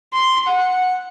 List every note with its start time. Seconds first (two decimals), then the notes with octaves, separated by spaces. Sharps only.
0.13 C6
0.47 F#5